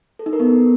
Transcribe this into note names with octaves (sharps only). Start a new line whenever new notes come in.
A4
D#4
A#4
B3